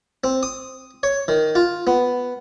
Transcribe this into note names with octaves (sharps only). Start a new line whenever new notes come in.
C4
D#6
C#5
D#3
F4
B3